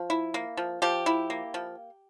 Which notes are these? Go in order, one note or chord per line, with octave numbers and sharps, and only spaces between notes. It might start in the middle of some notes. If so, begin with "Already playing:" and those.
Already playing: F3
E4
A#3
F3
F3 G4
E4
A#3
F3